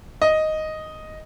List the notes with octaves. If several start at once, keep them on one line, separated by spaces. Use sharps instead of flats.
D#5